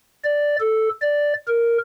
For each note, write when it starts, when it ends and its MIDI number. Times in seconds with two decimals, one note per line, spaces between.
0.24 0.56 74
0.60 0.89 69
1.02 1.34 74
1.47 1.78 70